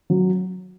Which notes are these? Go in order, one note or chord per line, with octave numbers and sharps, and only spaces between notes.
F#3